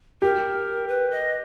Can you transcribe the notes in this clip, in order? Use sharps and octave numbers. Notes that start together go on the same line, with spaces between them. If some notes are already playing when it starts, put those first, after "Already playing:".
G4 A#4
B4
D#5